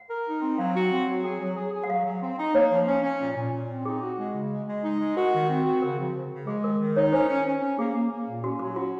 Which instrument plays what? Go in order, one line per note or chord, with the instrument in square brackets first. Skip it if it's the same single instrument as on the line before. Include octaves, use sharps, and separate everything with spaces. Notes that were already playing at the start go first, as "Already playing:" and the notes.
Already playing: [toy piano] F#5
[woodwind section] A#4
D#4
C4
[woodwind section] F#3 [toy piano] F5
[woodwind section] F#4
C4
F#3
G#4
F#3
G#4
G#4
[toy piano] F#5
[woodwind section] F#3 [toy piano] F5
[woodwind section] F#3
C4
D#4
[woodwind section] A#3 [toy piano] C#5
[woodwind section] F3
C#4
C#4
A#2
A#2
A#2
C4
[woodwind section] D#4 [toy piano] G#4
[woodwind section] F#4
G#3
C#3
G#3
G#3
D#4
G#3
[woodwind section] F#4 [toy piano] A#4
[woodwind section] D#3
C4
F#4
[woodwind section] C#3 [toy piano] A#4
[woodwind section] F3
C#3
C#3
[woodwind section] G#3 [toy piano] G#4
[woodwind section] D#3 [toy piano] A#4
[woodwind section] D#3
[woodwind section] D#4 [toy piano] C#5
[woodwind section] C#4 [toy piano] C5
[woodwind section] C#4
C#4
C#4
[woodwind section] A#3 [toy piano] G#4
[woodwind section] A#3
A#3
A#2
[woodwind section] C#4 [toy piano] F#4
[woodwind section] F#3 [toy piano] F#4
[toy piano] F4 [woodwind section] F#4